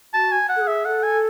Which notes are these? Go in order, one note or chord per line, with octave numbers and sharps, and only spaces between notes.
F#4 A5
G#5
F#5
A4
G#4
E5
A4 F#5
G#5